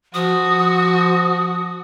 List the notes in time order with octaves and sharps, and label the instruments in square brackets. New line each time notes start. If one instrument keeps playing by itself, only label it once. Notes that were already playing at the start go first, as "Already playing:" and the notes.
[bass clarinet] F3 [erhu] F#4 [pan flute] D#6